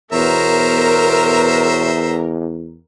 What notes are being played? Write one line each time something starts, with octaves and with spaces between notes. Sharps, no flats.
E2 B2 B3 A#4 C5 C#5 E5 A#5